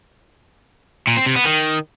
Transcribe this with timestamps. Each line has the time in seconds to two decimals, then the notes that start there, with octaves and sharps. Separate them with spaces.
1.07 A#2
1.17 C4
1.26 C3
1.36 B3
1.45 D#3